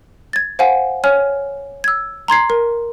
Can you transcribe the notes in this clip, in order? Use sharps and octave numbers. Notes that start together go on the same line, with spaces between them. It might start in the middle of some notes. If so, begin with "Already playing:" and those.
G#6 A6
C5 F5 F#5 G#5
C#5 G#5 F6
E6 G#6
A#5 C6 G#6 C7
A#4